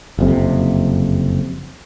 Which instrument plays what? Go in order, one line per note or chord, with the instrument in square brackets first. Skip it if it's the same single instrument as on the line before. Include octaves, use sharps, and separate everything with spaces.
[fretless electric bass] F#1 F2 C3